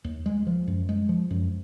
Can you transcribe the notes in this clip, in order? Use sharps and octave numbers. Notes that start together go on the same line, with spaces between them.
D#2
G#3
F3
F#2
G#3
F3
F#2